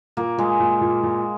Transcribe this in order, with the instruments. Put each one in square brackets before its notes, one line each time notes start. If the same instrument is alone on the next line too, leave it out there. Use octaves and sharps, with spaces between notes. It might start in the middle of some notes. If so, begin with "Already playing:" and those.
[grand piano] A#2 [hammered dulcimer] A#3
[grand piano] A#2 [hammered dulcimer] G#3
[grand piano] A#2
A#2
A#2